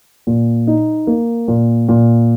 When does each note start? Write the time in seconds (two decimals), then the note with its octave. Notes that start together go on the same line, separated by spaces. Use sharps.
0.27 A#2
0.67 D#4
1.07 A#3
1.48 A#2
1.89 A#2